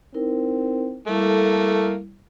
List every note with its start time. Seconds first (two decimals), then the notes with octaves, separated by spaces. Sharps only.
0.14 C4 D#4 E4 A#4
1.07 G3 A3 A#3 E4 A4